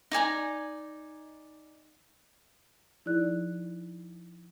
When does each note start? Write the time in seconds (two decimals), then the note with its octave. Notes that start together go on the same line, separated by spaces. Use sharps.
0.11 D#4 D5 G#5 A#5
3.06 F3 D#4 E4 G#4 D5 F#6